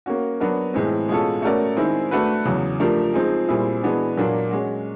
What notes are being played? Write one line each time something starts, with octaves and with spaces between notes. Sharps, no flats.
A#3 C#4 F#4
F#3 B3 D4 F#4 A#4
A2 E3 G#3 C4
B2 G#3 C#4 F4 A4
A3 C#4 F#4 A#4 D5
D#3 G#3 C4 E4 G#4
A3 D4 F#4 B4
E2 C#3 F#3
F3 A3 D4 G4 A#4
F3 G#3 C4 D#4 G#4
A#2 G3 C4 E4 G#4
E3 G#3 B3 D4 F#4
A#2 F#3 A#3 D4
G#3 C#4 F#4